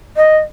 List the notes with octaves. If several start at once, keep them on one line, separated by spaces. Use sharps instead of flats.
D#5